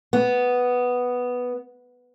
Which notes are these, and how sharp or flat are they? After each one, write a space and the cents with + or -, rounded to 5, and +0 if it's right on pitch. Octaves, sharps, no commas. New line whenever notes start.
B3 +0